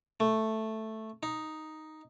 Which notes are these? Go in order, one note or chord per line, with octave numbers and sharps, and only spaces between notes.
A3
D#4